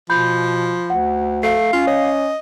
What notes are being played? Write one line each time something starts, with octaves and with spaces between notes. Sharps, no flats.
B2 F3 B5 G6
D2 F#5
A3 F5 C7
C#4 F4
C#5 D#5